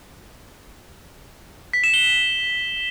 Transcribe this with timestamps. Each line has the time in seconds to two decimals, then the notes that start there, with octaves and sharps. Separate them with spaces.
1.73 B6
1.84 E7
1.94 G7